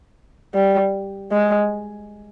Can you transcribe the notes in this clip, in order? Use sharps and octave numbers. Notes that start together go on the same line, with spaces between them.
G3
G#3